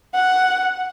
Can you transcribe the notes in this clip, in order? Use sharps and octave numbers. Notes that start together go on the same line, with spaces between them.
F#5